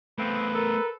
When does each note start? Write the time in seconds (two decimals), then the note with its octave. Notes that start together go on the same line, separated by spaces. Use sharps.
0.19 F3 A3 B3 C4 B4
0.55 A4 A#4